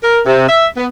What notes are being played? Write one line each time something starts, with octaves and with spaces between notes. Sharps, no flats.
A#4
C3
E5
B3